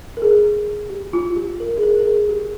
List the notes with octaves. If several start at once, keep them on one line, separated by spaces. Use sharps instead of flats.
A#4
G#4
G4
F4
G4
A#4
G#4
A#4
A#4
G#4
G4